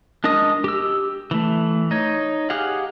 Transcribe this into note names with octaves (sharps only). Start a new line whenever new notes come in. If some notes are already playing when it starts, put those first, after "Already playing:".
G#3 D4 A#4 D#5 D#6
G4 E6
E3 A3
D#4 C#5
G4 G#4 F5 F#5